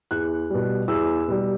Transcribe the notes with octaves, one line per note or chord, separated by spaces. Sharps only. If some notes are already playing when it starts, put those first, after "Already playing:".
E2 F#6
B2 G3
E2 E6
B2 G3